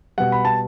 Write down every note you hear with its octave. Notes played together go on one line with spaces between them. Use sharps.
B2 G3 F#5
B5
A5